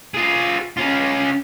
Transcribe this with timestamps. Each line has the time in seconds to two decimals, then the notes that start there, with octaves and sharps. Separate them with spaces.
0.14 F4 G#4
0.77 C#4 F4